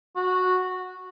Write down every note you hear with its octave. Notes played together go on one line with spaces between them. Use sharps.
F#4